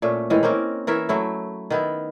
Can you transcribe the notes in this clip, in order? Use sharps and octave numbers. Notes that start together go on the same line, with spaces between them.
A#2 A3 C#4
A2 D#3 E3 G#3
A#3 C4 C#4 A#4
E3 A#4 C#5 E5
F#3 A3 E4
D#3 B3 E4